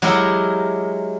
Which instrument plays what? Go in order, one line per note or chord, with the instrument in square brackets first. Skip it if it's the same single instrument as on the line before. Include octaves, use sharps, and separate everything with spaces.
[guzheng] F#3 G#3 E4 G4 A#4